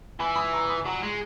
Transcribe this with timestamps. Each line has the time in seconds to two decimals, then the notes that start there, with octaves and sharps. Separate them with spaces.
0.19 E3 G#5 B5
0.36 B5 D#6
0.53 A#5 C#6
0.63 C#6
0.68 B5 D#6
0.85 F#3 A#5 C#6
1.02 G#3